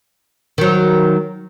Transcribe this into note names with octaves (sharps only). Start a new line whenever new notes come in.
D#3 F#3